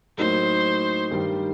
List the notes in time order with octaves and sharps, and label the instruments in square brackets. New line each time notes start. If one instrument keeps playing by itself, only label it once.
[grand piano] A2 F#3 A#3 D#4 F#4 [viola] C5
[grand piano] G2 D#3 G3